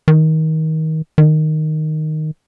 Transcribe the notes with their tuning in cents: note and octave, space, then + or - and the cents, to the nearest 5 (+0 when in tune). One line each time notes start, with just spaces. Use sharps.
D#3 +25
D#3 -5